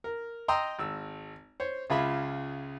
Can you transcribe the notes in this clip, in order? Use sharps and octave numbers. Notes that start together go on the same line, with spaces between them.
A#4
D#5 G5 A#5 C6 D#6 E6
G#1 E6
C5 C#5
C#2 C#3 F4 G#4 E5 B5